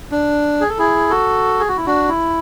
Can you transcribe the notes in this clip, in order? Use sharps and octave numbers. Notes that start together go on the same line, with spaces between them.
D4
G#4
A4
E4 G#4
F#4 A4
G#4
F#4
E4
D4 F#4
E4